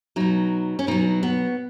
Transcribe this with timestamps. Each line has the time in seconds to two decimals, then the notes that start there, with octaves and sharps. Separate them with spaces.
0.16 B2 F#3 D#4
0.79 C#4
0.87 B2 F#3 D#4
1.23 B3